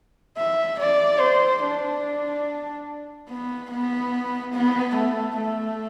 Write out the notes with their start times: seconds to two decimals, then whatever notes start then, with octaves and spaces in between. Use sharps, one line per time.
0.36 E5
0.79 D5
1.20 C5
1.62 D4
3.29 B3
3.70 B3
4.53 B3
4.95 A3
5.36 A3